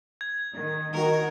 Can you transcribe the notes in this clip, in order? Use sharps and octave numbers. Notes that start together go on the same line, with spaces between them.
G#6
D#3
D#3 D#4 F#4 A#4